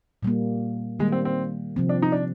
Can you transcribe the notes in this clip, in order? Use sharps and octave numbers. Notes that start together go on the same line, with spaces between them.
A#2 G3 A#3
D#3 G3 G#3 A#3
C4
C4
C3 F3 C4
D4
D#4
D4